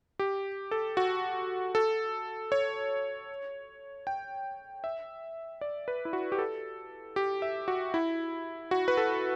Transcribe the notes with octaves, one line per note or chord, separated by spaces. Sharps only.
G4
A4
F#4
A4
C#5
G5
E5
D5
B4
E4
F#4
G4
A4
G4
E5
F#4
E4
F#4
B4
A4